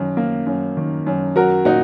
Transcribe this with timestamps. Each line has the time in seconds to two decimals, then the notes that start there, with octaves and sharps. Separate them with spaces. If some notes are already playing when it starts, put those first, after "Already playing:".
Already playing: F#2 D#3
0.17 A#3
0.47 F#2
0.77 D#3
1.07 F#2
1.36 F#3 F#4 A#4
1.65 A#2 D#4 F#4